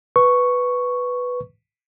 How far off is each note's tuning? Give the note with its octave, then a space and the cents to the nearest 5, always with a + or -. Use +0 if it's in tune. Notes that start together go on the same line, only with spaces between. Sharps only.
B4 +0 C#6 +0